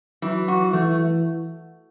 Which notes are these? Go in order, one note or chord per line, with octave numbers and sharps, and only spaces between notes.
E3 F#3
F#4
E3 A3